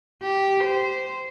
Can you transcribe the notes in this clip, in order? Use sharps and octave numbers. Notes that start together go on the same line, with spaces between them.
G4
C5